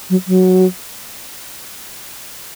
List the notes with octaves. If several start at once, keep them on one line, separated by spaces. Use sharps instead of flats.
F#3
F#3